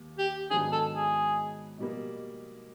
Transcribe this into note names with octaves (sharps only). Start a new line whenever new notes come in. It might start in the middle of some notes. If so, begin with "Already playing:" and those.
Already playing: D#2
G4
G#2 D#3 F#3 B3 D4 G#4
A4
G#4
B2 G3 A#3